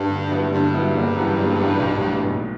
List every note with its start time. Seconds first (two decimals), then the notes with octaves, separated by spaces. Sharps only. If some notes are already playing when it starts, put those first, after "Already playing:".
Already playing: G2
0.09 D3
0.31 G3 B3 E4
0.52 G2 D3
0.74 G3 B3 E4
0.95 F#1
1.16 F#2 E3 G3 B3
1.37 F#1
1.59 F#2 E3 G3 B3
1.80 B1
2.01 A2 E3 B3
2.23 B1